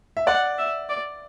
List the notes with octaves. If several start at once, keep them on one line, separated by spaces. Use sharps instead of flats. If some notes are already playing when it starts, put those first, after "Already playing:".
E5
D5 F#5
E5
D5